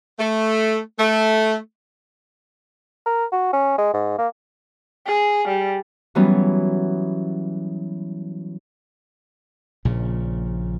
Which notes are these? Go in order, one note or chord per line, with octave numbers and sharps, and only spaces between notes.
A3
A3
A#4
F#4
C#4
G#3
G#2
A#3
G#4
G3
E3 F#3 G3 B3 C#4
A#1 A#2 C#3